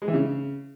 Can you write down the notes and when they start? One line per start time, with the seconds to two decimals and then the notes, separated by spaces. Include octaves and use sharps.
0.02 G#3
0.08 E3
0.14 C#3